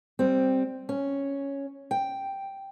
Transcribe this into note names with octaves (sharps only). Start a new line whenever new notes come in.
G3 C4
C#4
G5